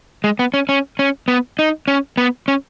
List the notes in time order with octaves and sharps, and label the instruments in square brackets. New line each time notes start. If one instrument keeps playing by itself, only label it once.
[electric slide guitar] G#3
B3
C#4
C#4
C#4
B3
D#4
C#4
B3
C#4